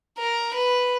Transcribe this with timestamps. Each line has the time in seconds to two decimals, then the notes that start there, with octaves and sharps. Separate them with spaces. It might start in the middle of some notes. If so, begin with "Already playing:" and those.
0.18 A#4
0.54 B4